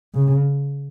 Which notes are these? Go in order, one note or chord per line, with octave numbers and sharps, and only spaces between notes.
C#3